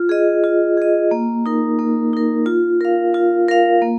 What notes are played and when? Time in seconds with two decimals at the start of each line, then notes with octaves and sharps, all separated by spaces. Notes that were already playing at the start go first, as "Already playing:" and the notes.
Already playing: F4
0.09 G#4 D#5
0.44 F4
0.77 G#4 D#5
1.11 A#3
1.46 D#4 A#4
1.79 A#3
2.13 D#4 A#4
2.46 F4
2.81 A#4 F5
3.14 F4
3.48 A#4 F5
3.82 A#3